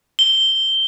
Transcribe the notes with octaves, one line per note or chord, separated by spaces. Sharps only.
G7